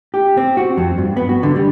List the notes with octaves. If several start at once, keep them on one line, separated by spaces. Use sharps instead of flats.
G4
C4
F#4
F2
G2
B3
F#4
D3
G3